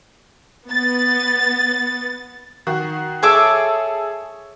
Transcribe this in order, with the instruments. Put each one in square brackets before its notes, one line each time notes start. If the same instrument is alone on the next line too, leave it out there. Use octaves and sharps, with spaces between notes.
[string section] B3 A6
[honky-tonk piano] D#3 F#4
[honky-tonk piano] G#4 A4 E6 [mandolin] C#5 E5 D6